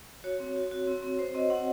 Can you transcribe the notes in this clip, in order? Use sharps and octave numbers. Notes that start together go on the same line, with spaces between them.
F#4 C#5
C4
F#4
F#4
C4
C4
C4 C5
C4 D#5
C4 F#5